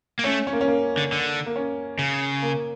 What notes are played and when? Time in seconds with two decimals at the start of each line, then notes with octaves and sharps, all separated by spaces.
0.19 A#3
0.24 A3 C#4
0.47 C#4
0.53 A#3
0.61 C#4
0.68 A#3
0.97 D3
1.12 D3
1.46 A#3
1.56 C#4
1.99 C#3
2.43 A#3